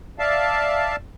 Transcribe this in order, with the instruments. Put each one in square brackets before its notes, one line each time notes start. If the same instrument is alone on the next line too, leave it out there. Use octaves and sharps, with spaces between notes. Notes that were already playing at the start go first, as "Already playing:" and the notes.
[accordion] D5 E5 F5 A5